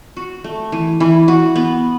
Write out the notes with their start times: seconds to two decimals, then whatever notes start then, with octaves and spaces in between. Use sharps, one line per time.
0.17 F#4
0.44 A3
0.72 E3
1.00 E3
1.28 F#4
1.55 B3